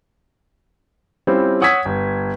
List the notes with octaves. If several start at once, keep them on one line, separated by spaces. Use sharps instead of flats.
G3 C4 C#4 E4 F4 G4
C#5 F#5 D#6 E6 G#6 B6
G1